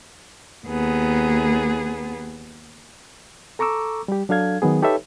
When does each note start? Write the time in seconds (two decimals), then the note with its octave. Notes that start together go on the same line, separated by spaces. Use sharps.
0.67 D#2 B3 G#4
3.59 A4 A#5 C#6 D6 E6
4.08 G3 G4
4.29 F#3 D4 A4 F5 G#6
4.62 D#3 F#3 B3 G#4
4.82 D#4 G4 A4 B4 C#5 E5